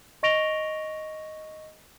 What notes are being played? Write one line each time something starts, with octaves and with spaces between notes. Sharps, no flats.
D#5 C#6 A#6 D7 F7 G7